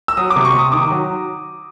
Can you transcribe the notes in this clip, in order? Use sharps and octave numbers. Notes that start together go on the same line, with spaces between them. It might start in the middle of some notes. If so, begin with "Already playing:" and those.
E6
F#3 D#6
D6
C3
C#6
C3
D#6
D#3 D6
F#3